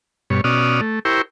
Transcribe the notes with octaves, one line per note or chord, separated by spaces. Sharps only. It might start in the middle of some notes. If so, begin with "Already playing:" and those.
G2 B2 C#5
B2 C#4 F#4 D5 D#6 F6
A3
E4 G4 A#4 C5 G5 C#6